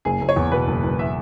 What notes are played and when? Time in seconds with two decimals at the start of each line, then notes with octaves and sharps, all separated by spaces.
0.05 F#1 G#4
0.21 F#1
0.29 C#5
0.36 E2
0.52 B2 B4
0.68 F#1
0.83 F#1
0.99 E5